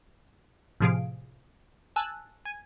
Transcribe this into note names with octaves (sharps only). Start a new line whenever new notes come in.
A2 C3 F3 G#4 F5 D7
G#5 A5 E6 F#6
G#5